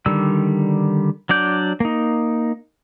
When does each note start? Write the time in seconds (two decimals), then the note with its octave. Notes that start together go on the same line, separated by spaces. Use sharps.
0.06 D3 D#3 G3 E6
1.29 F#3 D4 D5 G6
1.80 A#3 D#4